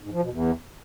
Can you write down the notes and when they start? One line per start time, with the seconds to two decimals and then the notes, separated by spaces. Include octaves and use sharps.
0.03 G#2
0.12 F3
0.21 B2
0.30 E2